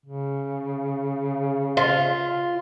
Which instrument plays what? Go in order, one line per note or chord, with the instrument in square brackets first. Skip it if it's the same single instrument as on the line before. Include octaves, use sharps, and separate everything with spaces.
[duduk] C#3
[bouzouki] F4